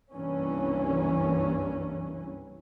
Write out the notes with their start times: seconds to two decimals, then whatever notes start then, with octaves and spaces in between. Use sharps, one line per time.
0.14 F#1 C2 G2 E3 A#3 C#4